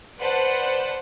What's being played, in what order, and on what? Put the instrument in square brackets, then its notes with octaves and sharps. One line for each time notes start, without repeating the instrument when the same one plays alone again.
[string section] B4 C5 D5 F#5 A5